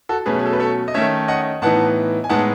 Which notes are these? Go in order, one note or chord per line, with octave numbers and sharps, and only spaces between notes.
F#4 A4
B2 F#3 A3 C#4 G#4 B4
G#4
A4
B4
A4 C#5
D#5
D#3 A3 C#4 C#5 E5
D#5 F#5
A2 E3 B3 D#4 F#5 A5
G#5
A2 G#3 B3 D#4 F#5 A5